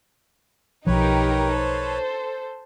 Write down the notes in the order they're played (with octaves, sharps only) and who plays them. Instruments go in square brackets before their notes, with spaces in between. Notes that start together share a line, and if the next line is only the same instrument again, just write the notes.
[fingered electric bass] B1 F3 [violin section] D#4 G4 A#4 [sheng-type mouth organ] B4 C#5
[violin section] A4 C5